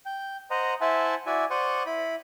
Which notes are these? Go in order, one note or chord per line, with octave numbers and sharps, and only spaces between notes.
G5
C5 D#5 F#5 A#5
E4 C5 E5 F#5 G#5 A5
E4 F#4 D5 E5 G#5
C5 D5 F#5 C#6 D#6
E4 B5